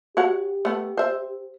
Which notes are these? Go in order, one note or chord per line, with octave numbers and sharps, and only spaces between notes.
F#4 G4 C#5 F#5
A3 B3
C5 E5